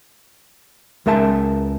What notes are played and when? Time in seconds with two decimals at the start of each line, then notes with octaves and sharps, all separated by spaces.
1.06 C#2 G#3 A#4 E5 A5